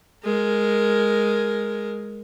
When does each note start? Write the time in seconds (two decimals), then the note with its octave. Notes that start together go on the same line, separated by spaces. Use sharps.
0.24 G#3 A#4